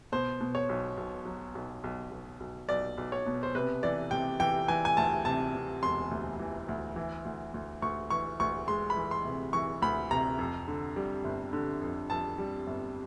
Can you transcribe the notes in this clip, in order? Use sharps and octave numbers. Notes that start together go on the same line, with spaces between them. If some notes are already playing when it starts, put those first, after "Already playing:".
B2 C5
B2
C#5
B1
B1
F#3
B1
B1
B1
B1
B1 D5
B1
C#5
B2
C5
C3 B4
E3 D5
C3 G5
E3 G5
E3 G#5
G#5
D2 A5
C3 A5
C3
E1 C6
D2
E3
D2
E3
D2
D2
D2 C#6
E3 C#6
D2 C#6
G#3 C6
B5
E3
C6
C3
E3 C#6
D2 B5
C3 A#5
F2
D3
G3
G1
D3
F2
F2 A5
G3
G1